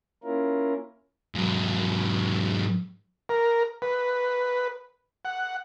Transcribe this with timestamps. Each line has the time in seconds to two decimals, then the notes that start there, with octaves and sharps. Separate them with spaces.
0.24 A#3 C#4 E4 F4 A#4
1.35 G#2 F#3
3.29 A#4
3.82 B4
5.25 F#5